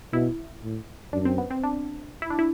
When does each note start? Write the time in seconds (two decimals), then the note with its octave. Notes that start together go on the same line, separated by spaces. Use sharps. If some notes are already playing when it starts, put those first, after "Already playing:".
0.13 B2 E4
0.63 A2
1.13 F#2 D4
1.25 C4
1.38 B3
1.50 C4
1.63 D4
2.22 E4
2.30 D4
2.39 E4